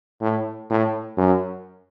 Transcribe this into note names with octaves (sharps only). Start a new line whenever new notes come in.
A2
A2
F#2